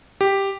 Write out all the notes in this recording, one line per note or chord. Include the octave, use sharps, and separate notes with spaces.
G4